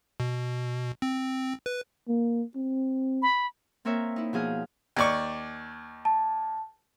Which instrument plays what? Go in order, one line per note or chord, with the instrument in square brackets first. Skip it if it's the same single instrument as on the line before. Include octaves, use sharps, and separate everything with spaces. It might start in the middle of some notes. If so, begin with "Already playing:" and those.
[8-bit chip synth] B2
C4
B4
[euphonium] A#3
C4
[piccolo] B5
[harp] A#3 C4 A#4 C#5 E5
D#4 E4
B2 F3 G#4 F5
[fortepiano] D#2 D5 C#6
[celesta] A5